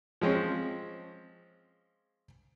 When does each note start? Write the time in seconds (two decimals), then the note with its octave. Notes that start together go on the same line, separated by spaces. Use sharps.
0.21 F3 G#3 C4 C#4